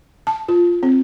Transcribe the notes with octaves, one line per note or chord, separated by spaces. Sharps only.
A5
F4
C4